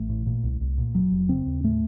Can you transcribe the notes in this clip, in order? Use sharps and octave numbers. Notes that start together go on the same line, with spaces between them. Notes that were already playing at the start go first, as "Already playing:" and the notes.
Already playing: A1 A3
A2
A#2
C2
C2
A#2
F1 F#3
F1
C#3 C4
D#2
A2 A3